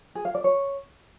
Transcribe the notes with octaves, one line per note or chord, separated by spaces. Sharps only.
G#4
F5
D5
C#5